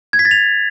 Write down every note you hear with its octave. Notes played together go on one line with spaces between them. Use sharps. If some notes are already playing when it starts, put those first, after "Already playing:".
G#6
B6
A6
F7